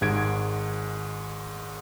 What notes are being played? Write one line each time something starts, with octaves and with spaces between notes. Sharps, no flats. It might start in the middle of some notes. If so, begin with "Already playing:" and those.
G#1 G#2 G#6 D7